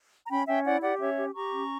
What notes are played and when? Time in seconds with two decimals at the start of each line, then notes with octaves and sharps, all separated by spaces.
0.25 A#5
0.30 C#4 G5 B5
0.47 C#4 E5 G5
0.65 E4 D5 F#5
0.82 G4 D5 F#5
1.00 C#4 C#5 E5
1.17 G4
1.34 G4 A#5 C#6
1.52 C#4